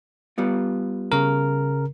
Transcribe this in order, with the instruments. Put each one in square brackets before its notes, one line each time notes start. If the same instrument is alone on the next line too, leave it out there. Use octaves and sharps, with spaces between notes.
[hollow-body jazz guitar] G3 B3 F4
[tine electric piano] C#3 A#4